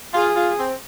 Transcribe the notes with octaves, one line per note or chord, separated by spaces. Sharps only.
F4 G#4
F4
C4